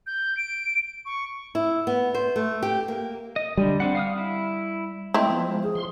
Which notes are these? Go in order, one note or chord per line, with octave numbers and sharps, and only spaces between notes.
G6
D7
C#6
E4
B3
C5
A3
G4
A#3
D#5
D3 G3
C4 D4 F#5
F5 D#6 F6
E4
G#3 A3 C4 E4 D#5
F3 B3
G#3
G#4
F3 C6